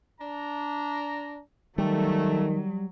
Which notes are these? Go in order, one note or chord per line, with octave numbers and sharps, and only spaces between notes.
D4 A#5
D#3 F#3 G3 A3